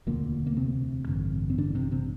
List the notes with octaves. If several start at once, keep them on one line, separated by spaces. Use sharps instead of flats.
E1 D2 A#2 D3 A#3
A#3
C3 C4
A1 G2 D3
C4
D3 D4
C3 C4
C3 C4